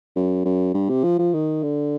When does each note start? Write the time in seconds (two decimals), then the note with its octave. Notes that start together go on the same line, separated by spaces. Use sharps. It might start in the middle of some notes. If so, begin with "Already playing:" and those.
0.16 F#2
0.45 F#2
0.74 G2
0.89 C3
1.03 F3
1.18 F3
1.34 D#3
1.63 D3